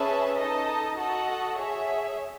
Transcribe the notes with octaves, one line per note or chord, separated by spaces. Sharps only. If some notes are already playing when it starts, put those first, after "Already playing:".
Already playing: C#4 G#4 B4 E5 A5
D#4 A4 D#5 A5
F#4 A4 D#5 F#5 A5
G#4 C#5 E5